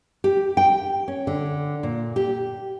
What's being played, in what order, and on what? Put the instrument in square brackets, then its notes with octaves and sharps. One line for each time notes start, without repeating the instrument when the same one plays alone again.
[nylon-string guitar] G4
G5
C#4
D3
A#2
G4